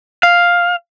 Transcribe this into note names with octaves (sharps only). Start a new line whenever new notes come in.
F5